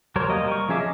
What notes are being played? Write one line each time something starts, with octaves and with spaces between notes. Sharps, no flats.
F#3 G3 A#4 C5 C#5
G3 A#3 D#5
A#4 C#6
F3 C#4 G#4 E5 D6
D#5